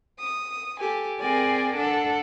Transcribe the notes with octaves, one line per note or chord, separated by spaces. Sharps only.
D#6
G4 A4 G#5
C4 G#4 A#4 D5 G5 G#5
D4 A4 F#5